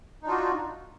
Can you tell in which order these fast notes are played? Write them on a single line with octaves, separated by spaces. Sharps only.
D#4 D4 F4 F#4